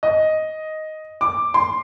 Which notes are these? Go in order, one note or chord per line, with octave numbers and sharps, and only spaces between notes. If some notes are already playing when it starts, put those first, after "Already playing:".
D#5
D6
C6